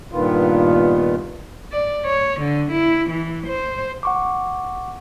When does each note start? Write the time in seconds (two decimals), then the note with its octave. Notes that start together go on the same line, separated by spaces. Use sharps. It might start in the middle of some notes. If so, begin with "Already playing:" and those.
0.12 G2 A#2 D#3 B3 F4
1.72 D5
2.06 C#5
2.41 D3
2.72 E4
3.10 E3
3.47 C5
4.03 F#5 C#6 D6